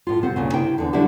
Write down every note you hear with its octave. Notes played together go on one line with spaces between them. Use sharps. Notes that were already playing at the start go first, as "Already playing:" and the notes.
A2 F4
C3 C4 F#5
D2 A#2 C#3
C3 E4 G5
E2 D3
D3 F#3 G3 A3 D4 E4